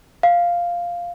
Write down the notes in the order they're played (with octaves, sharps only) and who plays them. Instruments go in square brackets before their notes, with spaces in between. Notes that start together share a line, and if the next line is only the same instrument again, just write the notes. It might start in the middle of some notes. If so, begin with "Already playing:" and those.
[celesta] F5